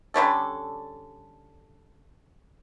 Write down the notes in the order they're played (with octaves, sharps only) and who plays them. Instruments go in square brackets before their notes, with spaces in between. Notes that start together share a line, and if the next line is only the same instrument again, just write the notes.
[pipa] D3 G3 C#4 A4